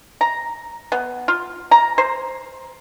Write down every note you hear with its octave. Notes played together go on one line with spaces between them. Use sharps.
A#5
B3
F4
A#5
C5